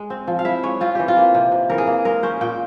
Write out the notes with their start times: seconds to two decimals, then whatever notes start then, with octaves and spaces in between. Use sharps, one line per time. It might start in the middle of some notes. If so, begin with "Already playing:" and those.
Already playing: G#3
0.10 C4
0.27 F3
0.39 F5
0.45 E4 E5
0.63 G#3 C#5
0.81 C4 F4
0.95 E3 G4
1.08 F4
1.17 A#3
1.34 C3
1.52 C3
1.70 E3 A#4
1.78 G#4
1.87 A#3
2.05 G#3 A#4
2.23 C#4 C5
2.41 A#2 G5